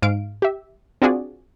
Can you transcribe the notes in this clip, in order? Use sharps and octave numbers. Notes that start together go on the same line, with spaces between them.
G#2 F5 D7
G4 E5
C4 D4 F4 F#4 G#4 D5